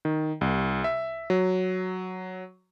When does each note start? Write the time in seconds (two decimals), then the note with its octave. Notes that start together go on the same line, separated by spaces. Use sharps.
0.05 D#3
0.41 C2
0.84 E5
1.30 F#3